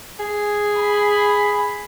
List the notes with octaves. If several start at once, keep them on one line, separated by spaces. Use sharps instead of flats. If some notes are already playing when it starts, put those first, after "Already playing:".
G#4
B5